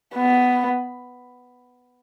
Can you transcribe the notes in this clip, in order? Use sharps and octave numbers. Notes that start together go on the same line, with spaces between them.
B3